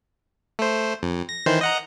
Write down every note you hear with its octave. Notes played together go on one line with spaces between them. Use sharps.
A3 C5
F2
A#6
D#3 E3 C5
D#5 F#5 A#5